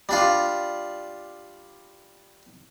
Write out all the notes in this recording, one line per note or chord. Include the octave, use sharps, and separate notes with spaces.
G3 D4 F4